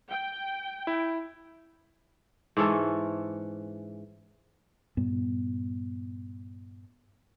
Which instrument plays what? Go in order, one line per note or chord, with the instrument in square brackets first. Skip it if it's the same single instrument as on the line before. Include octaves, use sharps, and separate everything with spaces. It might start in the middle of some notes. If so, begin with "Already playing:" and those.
[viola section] G5
[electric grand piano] E4
[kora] G#2 E3 C#4 A4
[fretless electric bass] G2 A#2 G3 B3